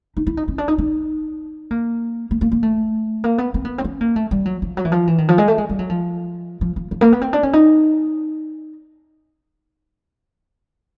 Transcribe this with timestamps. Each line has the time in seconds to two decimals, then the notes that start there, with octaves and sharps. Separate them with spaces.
0.17 D#4
0.27 E4
0.37 D#4
0.48 C#4
0.58 D4
0.68 D#4
0.78 D#4
1.71 A#3
2.31 A#3
2.41 A#3
2.52 A#3
2.63 A3
3.24 A#3
3.38 B3
3.54 C4
3.65 B3
3.78 C4
3.84 C#4
4.01 A#3
4.16 A3
4.31 G3
4.46 F#3
4.62 F3
4.77 F#3
4.85 E3
4.92 F3
5.07 E3
5.18 D#3
5.28 F3
5.38 G#3
5.48 A3
5.58 G#3
5.69 G3
5.79 F#3
5.90 F3
6.61 F3
6.76 F3
6.91 F3
7.01 A#3
7.12 B3
7.22 C4
7.33 D4
7.43 C#4
7.53 D#4